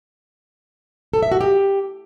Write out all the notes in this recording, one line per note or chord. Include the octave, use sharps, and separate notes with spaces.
A4
E5
F#4
G4